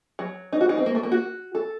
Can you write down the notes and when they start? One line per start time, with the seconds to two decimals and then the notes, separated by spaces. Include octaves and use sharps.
0.19 F#3
0.53 D#4
0.61 F#4
0.69 D#4
0.78 C4
0.86 A#3
0.95 A3
1.03 A#3
1.12 F#4
1.55 A4